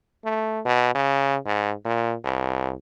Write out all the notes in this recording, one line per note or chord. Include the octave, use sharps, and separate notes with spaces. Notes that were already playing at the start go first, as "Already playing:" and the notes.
A3
B2
C#3
G#2
A#2
C2